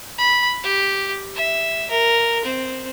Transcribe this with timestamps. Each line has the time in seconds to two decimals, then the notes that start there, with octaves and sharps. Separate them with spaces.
0.18 B5
0.63 G4
1.35 E5
1.91 A#4
2.45 C4